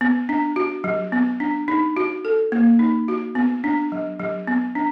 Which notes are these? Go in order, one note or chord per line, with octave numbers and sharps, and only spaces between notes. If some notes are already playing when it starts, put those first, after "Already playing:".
B3
D4
F#4
F#3
B3
D4
D#4
F#4
A4
A#3
D#4
F#4
B3
D4
F#3
F#3
B3
D4